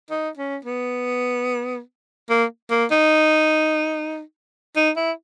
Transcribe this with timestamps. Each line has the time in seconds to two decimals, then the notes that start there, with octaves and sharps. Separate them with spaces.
0.10 D#4
0.38 C#4
0.65 B3
2.30 A#3
2.71 A#3
2.91 D#4
4.76 D#4
4.97 E4